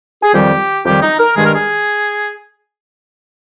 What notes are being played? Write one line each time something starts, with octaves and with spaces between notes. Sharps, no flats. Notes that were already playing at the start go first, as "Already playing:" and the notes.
G#4
F2 D#3 G3 G4
F2 D#3 G3 G4
D#4
A#4
G2 D#3 G#3 G#4
A#4
G#4